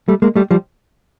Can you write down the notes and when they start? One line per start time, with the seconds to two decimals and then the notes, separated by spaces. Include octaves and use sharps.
0.08 G3 A3
0.22 G#3 A#3
0.36 G3 A3
0.51 F3 G3